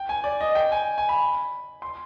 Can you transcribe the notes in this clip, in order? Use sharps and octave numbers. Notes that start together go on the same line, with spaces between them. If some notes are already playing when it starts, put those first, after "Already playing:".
Already playing: G5
G#5
D5
D#5
G5
G#5
G#5
B5
C6